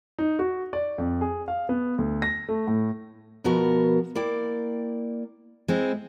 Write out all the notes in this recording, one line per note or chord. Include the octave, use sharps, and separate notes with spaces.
D#4
F#4
D5
F2
G#4
F5
B3
D2
A#6
A3
A2
B2 F3 B3 F#4 A#4
A#3 E4 D5 G5
G#3 C4 E4